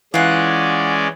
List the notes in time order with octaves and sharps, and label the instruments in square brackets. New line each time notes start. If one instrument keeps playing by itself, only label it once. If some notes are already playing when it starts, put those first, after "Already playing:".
[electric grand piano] E3 [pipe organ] G#3 C#4 D5 [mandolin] F4 F#5